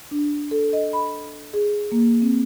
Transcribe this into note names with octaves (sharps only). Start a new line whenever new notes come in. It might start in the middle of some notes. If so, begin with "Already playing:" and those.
D4
A4
D#5
B5
G#4
A#3
C4